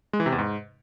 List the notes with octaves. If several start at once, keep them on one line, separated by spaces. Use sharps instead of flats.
G#3
E3
C3
E2
G#2